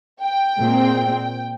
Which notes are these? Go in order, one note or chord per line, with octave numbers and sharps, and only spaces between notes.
G5
A#2 G#3 C4